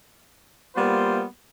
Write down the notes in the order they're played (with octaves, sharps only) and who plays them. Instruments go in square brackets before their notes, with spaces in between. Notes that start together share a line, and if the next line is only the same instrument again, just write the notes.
[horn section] G3 A#3 B3 F4 C5